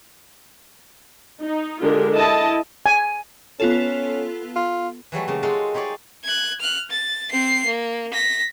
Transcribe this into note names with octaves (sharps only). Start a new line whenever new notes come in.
D#4
D3 G#3 F4 G4 A#4
E4 D#5 A5
G#5
B3 C#4 F4 A4
F4
E3 F#3 G3 A3
C#3 A3 A#3
G#3 D#4 F4 F#4 A4
D#4 G4 G#4 C#5 D5
F#6 G#6
F6 F#6
A6
C4 C7
A#3
A#6 B6